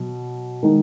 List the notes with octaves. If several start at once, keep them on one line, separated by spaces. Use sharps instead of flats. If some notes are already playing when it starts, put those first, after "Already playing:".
Already playing: B2 F#3
D#3 G#3 D#4